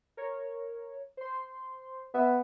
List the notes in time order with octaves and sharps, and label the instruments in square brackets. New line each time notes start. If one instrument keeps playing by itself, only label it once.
[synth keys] A#4 C#5
C5 C6
[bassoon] B3 [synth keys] E5